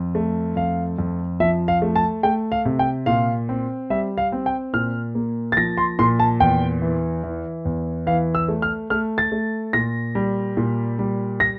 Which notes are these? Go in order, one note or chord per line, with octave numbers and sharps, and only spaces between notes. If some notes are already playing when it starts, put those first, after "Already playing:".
Already playing: F2
A3
F2 F5
F2
F3 E5
F5
A3
A5
A3 G5
F5
C3
G5
A#2 F5
C4
G3 E5
F5
C4
G5
A#2 F6
A#3
A6
F3 A#6
C6
A#2 C6
A5
E2 G5
E3
E3
E2
E3 F5
E6
A3
F6
A3 F6
A6
A3
A#2 A#6
G3
A#2
G3
A#6